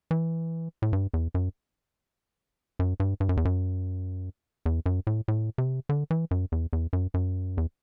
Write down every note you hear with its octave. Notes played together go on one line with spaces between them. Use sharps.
E3
A2
G2
E2
F#2
F#2
G2
G2
F#2
E2
F#2
E2
F#2
A2
A2
C3
D3
E3
F#2
E2
E2
F#2
F#2
E2